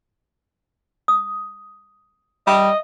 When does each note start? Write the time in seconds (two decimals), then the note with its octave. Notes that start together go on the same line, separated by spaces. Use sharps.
1.08 D#6
2.47 G3 D#5 E5